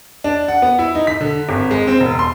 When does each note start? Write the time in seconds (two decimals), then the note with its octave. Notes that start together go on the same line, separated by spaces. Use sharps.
0.24 D4
0.48 F#5
0.62 B3
0.79 E4
0.95 D#4
1.07 B6
1.21 D3
1.49 G#1
1.71 G#3
1.87 C4
2.00 E1
2.19 C6